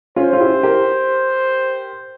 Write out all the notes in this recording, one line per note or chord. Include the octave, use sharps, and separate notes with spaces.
C#4 F4 C5
F4
E4 G4
G4 A#4